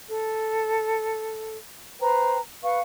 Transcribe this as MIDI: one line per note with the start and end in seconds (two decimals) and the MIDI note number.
0.09 1.57 69
2.01 2.38 71
2.01 2.38 72
2.01 2.38 79
2.01 2.38 82
2.63 2.80 71
2.63 2.80 77
2.63 2.80 85